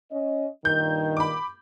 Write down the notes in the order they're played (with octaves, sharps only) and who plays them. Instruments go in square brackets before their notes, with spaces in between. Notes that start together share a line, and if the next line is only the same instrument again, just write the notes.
[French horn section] C#4 D#5
[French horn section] G2 A#2 D#3 [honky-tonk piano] G6
[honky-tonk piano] B5 D6